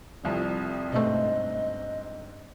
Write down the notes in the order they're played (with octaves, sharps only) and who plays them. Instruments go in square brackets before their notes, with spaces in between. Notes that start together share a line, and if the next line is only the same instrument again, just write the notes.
[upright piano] F1 C2 F2
[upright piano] G1 G#2 C4 [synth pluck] B2 A3 [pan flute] D#5